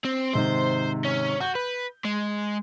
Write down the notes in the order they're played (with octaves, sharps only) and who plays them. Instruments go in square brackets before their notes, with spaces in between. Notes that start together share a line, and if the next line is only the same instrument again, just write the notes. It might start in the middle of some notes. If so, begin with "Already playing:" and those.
[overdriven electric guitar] C4
[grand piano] G#2 C3 D#3 [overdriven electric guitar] C5
[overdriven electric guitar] C#4
[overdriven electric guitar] F#4 [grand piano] G6 G7
[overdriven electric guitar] B4
G#3